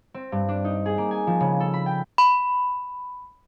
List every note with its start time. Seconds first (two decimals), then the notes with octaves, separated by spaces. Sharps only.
0.14 C4
0.32 G2
0.48 D4
0.65 D#4
0.86 G#4
0.98 A#3
1.11 G#5
1.27 F3
1.40 C#3
1.60 A4
1.73 B5
1.86 G5
2.18 B5